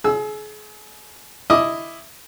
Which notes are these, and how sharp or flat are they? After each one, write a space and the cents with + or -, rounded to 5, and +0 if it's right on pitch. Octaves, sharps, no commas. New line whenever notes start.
G#4 +35 E6 +0
E4 +0 D#5 +0 D6 +0